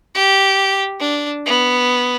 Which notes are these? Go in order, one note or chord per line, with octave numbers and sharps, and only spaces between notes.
G4
D4
B3